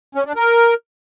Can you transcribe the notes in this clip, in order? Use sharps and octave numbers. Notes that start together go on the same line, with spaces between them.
C#4
D4
A#4